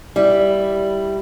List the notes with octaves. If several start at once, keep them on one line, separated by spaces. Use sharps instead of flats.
G3 E4